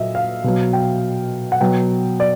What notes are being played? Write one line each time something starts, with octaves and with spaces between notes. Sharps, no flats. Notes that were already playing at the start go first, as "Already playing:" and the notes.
Already playing: A#2 F#3 D#5 E5
F5
B2 F#3
G5
F#5
B2 F#3 G5
D5